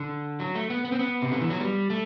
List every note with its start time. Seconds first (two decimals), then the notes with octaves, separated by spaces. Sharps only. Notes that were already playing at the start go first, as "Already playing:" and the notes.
Already playing: D3
0.40 F#3
0.55 A3
0.70 B3
0.85 B3
0.92 C4
0.99 B3
1.22 C3
1.32 D3
1.41 E3
1.50 F#3
1.60 G3
1.90 A3